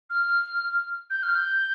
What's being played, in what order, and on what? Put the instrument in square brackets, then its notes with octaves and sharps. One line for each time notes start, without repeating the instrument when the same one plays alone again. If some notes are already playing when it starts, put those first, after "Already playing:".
[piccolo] F6
G6
F6
G6